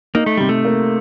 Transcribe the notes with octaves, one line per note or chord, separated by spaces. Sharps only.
A#3 D#4
A3
C3 G3
A3
A#3